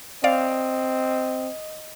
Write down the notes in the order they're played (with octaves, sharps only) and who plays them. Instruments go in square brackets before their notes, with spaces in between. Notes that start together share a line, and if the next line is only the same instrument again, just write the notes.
[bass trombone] C4 [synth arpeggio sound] D5 F5 [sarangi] D#5